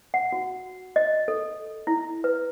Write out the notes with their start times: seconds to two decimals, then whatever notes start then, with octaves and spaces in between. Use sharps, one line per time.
0.14 F#5
0.33 F#4
0.96 D#5
1.28 A4
1.87 E4
2.24 B4